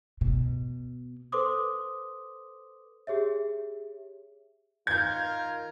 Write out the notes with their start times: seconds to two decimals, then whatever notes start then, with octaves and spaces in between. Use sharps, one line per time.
0.21 B2
1.32 A4 B4 C5 C6 D6 D#6
3.07 G4 G#4 C#5 E5
4.87 D#3 F4 A#4 G6 G#6